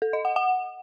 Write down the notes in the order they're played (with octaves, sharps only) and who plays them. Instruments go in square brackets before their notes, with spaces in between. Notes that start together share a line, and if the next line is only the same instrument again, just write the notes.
[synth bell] A4
D#5
F#5
F#5